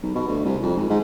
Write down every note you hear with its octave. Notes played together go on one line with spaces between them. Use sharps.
B1
B2
D2
C2
F2
G#1
G#2